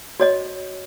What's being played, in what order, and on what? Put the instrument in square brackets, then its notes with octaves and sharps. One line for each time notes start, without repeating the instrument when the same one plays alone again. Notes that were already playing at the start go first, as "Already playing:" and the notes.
[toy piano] F#4 C#5 D#5